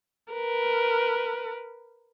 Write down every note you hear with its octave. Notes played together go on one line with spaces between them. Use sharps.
A#4 B4